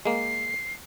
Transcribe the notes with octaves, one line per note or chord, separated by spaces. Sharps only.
G#3 A#3 C7